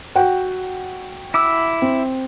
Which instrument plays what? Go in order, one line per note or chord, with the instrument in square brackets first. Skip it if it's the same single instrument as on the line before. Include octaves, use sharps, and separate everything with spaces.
[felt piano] F#4 F#5 G5
[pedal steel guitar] E4 D6 E6
[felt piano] C4